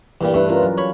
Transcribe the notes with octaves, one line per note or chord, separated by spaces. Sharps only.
G2 A#2 E3 G3
G2 G3 A3 D4 B4
C#4 F4 A#4
F#3
C#5 B5